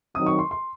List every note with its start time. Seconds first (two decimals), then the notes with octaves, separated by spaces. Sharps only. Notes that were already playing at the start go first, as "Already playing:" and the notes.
0.15 D#3 F#3 C4 D#4 D#6
0.26 C#6
0.39 C6
0.51 C6